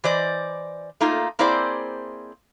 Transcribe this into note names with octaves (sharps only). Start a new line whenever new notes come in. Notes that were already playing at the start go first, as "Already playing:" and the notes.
E3 C5 D5 D#5
A3 A#3 D#4 F4
A#3 C4 E4 G#4 C5 D5